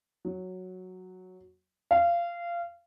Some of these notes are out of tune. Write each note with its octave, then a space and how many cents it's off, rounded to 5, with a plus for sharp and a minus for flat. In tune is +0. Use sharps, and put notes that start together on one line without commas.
F#3 -5
F5 -20